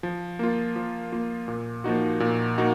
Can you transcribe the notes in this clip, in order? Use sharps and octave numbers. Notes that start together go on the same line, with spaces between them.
F3
A#3 F4
F3
A#3 F4
A#2
F3 A#3 D#4 F#4
A#2
A#3 D#4 F#4